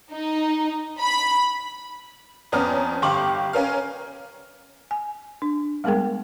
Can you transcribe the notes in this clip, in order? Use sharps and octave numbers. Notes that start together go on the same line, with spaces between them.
D#4
B5
F2 B3 C#4 D5 A#5 F6
G1 G4 F5 C#6 D6 F#7
C#4 A#4 F5
G#5
D4
G3 G#3 B3 G#4 A#4 G5